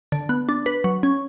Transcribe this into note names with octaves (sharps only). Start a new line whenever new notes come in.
D3
B3
D4
B4
F#3
C#4